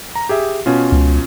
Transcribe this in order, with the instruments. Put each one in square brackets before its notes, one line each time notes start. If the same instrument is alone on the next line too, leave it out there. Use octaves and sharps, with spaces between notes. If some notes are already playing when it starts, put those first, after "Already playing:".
[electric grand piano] A#5
G4 G#4 E5
B2 C#4 F4
[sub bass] C#2